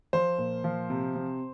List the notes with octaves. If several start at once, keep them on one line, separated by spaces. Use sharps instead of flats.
F3 C5
A#2
F3
C3
C3